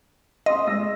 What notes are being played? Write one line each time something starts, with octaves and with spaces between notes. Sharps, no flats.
D#5 C6 D#6
G#3 E6 A#6